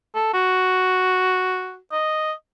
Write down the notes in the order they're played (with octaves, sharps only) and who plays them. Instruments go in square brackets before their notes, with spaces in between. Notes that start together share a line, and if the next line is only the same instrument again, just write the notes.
[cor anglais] A4
F#4
D#5